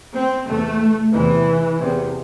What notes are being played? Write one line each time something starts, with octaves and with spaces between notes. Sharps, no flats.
C4
E2 C3 A3
E2 C3 E3
E2 C3